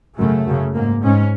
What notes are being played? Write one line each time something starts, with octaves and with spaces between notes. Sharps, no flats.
F#2 C#3 A3
F#2 C#3
G#2 A#3
G#2 C#4